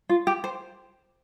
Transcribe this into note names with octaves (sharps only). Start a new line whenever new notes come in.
F4
G4
C5